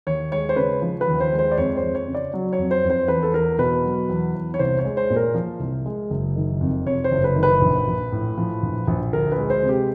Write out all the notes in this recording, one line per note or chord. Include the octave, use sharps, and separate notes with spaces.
D#2 C#5
G#3 C#5
C5
C#3 B4
F3
B4
D#2
C5
G#3
C5
D5
F2 C#5
C5
F2
C#5
C#3
D5
F#3
C#5
F2
C5
F2
C5
E2 B4
A4
E2 A#4
B2 B4
F#3
E2
E2
C#5
C2 C5
C#5
G#3
C5
A#2
A#4
F3
C2
G#3
F#1
D#3
F2
C3 C#5
C5
F#1
B4
D#3
B4
A#1
A#1
A2
F3
A#1
A#1
D2 A#4
B4
G#3
C5
C3
G4